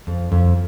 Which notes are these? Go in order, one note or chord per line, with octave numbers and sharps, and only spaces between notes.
F2
F2